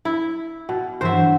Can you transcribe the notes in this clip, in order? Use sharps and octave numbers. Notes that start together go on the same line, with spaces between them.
E4
B2
G2 E3 F#3 C5 E5